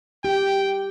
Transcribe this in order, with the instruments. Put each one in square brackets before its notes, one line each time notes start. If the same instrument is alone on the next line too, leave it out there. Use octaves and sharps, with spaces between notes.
[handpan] G4 [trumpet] G5